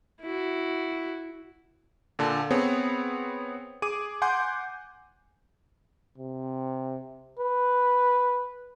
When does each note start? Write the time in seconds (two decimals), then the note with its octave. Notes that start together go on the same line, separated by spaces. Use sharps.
0.22 E4 F#4
2.19 A#2 D3 A5
2.51 B3 C4 G#4 C#5
3.82 G#4 D6 D#7
4.22 F#5 G#5 C6 D6 G6
6.18 C3
7.39 B4